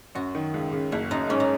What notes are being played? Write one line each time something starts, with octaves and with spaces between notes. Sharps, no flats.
F#2 F#4
D#3
C#2
C#3
F#1 E4
F#2 D#4
G#2 C#4
D#4